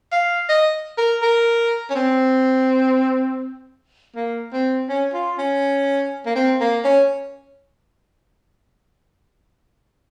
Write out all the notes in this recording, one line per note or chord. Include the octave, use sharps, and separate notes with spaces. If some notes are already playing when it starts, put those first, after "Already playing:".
F5
D#5
A#4
A#4
C#4
C4
A#3
C4
C#4
F4
C#4
A#3
C4
A#3
C#4